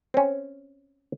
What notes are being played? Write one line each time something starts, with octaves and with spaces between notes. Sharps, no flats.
C4 C#4